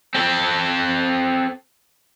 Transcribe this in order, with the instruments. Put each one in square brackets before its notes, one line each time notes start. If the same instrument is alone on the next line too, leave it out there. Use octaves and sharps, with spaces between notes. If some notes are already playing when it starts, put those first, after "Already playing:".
[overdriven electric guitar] C4 A4